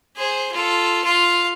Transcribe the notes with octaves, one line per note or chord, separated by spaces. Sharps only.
G#4 C5
F4 A4
F4 F5